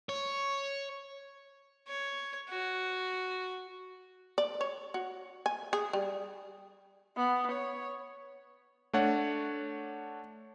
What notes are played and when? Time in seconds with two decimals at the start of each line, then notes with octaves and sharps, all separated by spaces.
0.09 C#5
1.88 C#5
2.49 F#4
4.38 D5
4.61 C#5
4.94 F#4
5.46 G#5
5.73 G#4
5.93 G3
7.17 B3
7.52 C#5
8.93 A3 D4 C#5 F#5